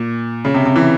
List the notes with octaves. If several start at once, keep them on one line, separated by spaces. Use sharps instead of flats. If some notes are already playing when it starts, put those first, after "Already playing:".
Already playing: A#2
C#3
C3
C3
E3